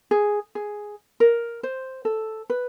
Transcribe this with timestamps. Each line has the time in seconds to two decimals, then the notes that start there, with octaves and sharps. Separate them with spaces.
0.11 G#4
0.55 G#4
1.20 A#4
1.63 C5
2.05 A4
2.50 B4